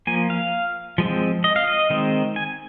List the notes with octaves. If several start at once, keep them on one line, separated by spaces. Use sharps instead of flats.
F3 A#3 G#5
F5
F3 G#3 C4
D#5
F5
D#5
D#3 G#3 C4
G#5